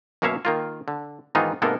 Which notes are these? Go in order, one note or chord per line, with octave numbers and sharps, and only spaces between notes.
F#2 B2 A#3 C#5 E5 F5
D#3 A#3 F4
D3
G#2 D#3 E3 B3 D#4 F4
G#2 C3 A#3 B3 A4 A#4